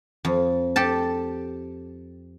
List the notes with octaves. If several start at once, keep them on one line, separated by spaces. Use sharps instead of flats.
F2
G4 A4 A5